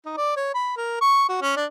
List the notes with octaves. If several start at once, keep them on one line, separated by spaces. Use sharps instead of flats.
D#4
D5
C#5
B5
A#4
C#6
F#4
C#4
D4